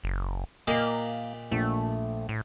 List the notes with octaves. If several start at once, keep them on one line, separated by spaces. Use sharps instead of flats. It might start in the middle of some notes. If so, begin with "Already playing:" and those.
F#1
A#2 A#3 G4 D#5
A#1 A3
A2